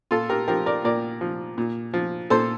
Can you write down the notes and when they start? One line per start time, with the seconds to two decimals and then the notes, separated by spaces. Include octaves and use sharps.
0.11 A#2 F4 A4
0.29 G4 A#4
0.48 F3 G4 A#4
0.66 A#4 D5
0.84 A#2 A#4 D5
1.21 F3
1.58 A#2
1.94 F3
2.30 A#2 A4 C5